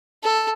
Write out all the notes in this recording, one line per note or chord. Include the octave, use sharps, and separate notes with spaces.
A4